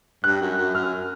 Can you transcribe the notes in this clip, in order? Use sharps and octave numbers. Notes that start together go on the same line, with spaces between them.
G2 F#6
F#2
F#2
F#2 F6